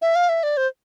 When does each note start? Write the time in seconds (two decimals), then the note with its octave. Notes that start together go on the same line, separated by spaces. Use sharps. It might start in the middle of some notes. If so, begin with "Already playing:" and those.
0.02 E5
0.16 F5
0.29 E5
0.43 D5
0.57 C5